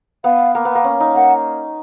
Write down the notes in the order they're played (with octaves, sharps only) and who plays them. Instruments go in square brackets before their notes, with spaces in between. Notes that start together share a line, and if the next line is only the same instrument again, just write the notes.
[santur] B3 [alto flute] F5
[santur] A#3
B3
A#3
C#4
D#4
[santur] A#3 [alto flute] F#5